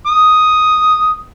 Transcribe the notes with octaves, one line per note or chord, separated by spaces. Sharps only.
D#6